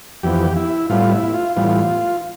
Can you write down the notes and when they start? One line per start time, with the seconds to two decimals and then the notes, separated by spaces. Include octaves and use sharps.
0.23 F2 E3 B3 G4
0.56 E4
0.89 A2 G3 B3 F4
1.12 E4
1.34 F4
1.56 A2 E3 G3 B3 F4